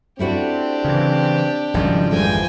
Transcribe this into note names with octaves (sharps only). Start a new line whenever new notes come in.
A3 C4 D4 E4 F#4 G4
C#3 E3
G#1 C#3 F3 G3 D#4
F2 E3 F3 G#3 A3 G5 G#5